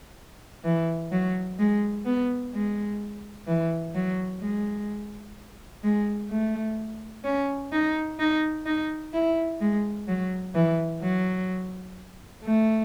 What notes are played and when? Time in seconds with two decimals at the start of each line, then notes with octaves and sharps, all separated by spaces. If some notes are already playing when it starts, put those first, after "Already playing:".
0.64 E3
1.12 F#3
1.59 G#3
2.06 B3
2.53 G#3
3.47 E3
3.95 F#3
4.41 G#3
5.84 G#3
6.30 A3
7.24 C#4
7.72 D#4
8.19 D#4
8.66 D#4
9.13 E4
9.60 G#3
10.08 F#3
10.55 E3
11.01 F#3
12.43 A3